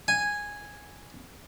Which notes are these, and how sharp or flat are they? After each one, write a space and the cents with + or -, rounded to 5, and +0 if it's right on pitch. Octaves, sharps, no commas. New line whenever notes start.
G#5 -5